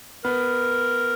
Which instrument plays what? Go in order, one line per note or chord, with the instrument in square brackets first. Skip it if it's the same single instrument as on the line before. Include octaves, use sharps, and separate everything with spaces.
[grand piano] B3 [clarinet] A#4